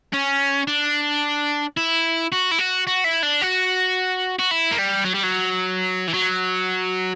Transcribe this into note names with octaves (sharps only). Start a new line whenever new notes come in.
C#4
D4
E4
F#4
E4
F#4
F#4
E4
D4
F#4
F#4
E4
A#3
G3
F#3
G3
F#3
E3
F#3